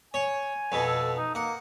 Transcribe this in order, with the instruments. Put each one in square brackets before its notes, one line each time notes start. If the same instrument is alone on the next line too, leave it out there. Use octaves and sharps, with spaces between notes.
[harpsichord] C#5 [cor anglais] G#5
[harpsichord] F2 B2
[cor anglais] A4
D#4
[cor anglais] A#3 [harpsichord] F#5